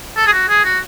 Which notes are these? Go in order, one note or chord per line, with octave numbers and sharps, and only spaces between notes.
A4
G#4
F#4
G#4
F#4